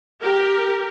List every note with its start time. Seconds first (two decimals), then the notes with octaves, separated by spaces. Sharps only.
0.21 G4 A#4